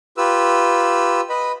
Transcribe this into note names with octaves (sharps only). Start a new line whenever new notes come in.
F4 G4 B4 E6
B4 D#5 B5